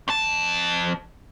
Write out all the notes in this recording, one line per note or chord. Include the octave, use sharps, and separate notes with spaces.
F2 A5